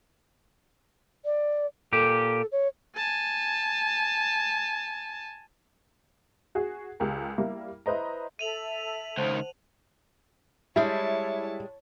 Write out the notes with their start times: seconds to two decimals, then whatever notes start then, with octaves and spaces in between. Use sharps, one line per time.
1.25 D5
1.93 A#2 G4 A4
2.52 C#5
2.96 G#5 A5
6.55 F#4 G#4
7.00 C#2 G4 A#4
7.38 G3 A#3 E4
7.86 E4 B4 C5 D#5 A#5
8.39 A4 E5 D#7 F7 F#7
9.18 C#2 D#3 C5 F#5 A5
10.76 G3 G#3 E4 C#5 A5